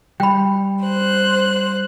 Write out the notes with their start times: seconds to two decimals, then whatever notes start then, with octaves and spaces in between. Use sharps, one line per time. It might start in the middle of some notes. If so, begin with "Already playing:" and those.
0.20 G3 G5 B5
0.85 C5 F#6